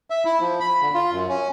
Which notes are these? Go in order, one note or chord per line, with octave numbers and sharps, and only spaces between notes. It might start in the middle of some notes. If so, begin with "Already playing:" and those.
E5
E4
F3
B5
D3
F4
F#2
C#4